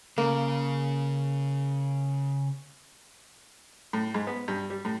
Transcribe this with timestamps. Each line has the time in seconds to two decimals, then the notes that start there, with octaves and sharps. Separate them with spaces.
0.18 C#3 A#3
3.93 A2
4.14 G#2
4.27 B3
4.48 G2
4.70 G3
4.85 A2